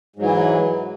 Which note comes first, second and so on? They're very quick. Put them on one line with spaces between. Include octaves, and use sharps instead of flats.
G#2 F#3 E3